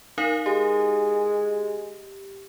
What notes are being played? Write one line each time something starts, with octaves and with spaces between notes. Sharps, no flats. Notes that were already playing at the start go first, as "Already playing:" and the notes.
D#4 A#4 F5
G#3 G4